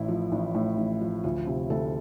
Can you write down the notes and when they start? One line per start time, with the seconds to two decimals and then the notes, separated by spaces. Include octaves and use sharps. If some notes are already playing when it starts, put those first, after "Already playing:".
Already playing: A1 A2 E4
0.08 F3
0.32 A1
0.55 A2
0.77 A1
1.01 F3
1.24 D2 F4
1.47 C3
1.70 D2 A4